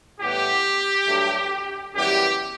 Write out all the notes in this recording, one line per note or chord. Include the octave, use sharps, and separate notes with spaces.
A2 E3 G3 B3 G4
G2 F#3 A3
F#2 E3 G3 B3 G4